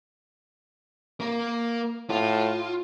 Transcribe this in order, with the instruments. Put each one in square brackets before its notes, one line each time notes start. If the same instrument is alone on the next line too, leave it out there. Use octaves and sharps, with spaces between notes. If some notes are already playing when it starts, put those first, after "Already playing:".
[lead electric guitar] A#3 A#4
[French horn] A2 [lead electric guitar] F4